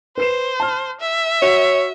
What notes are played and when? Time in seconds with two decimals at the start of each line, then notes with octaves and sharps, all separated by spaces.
0.18 B4 C5 C7 E7
0.60 A5 F6
1.00 E5
1.42 F#4 C#5